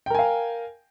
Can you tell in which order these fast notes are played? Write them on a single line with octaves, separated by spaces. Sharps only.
G5 A#4 G#5 F5